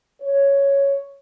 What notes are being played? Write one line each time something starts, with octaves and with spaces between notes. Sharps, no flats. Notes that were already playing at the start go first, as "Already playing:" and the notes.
C#5